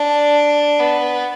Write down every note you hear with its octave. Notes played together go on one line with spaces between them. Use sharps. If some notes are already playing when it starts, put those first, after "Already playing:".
Already playing: D4
B3